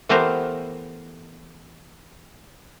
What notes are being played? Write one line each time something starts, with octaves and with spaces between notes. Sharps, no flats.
E3 A3 B3 G4 A#4 C5